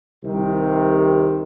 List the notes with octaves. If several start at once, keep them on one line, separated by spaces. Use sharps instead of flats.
C2 C3 D#3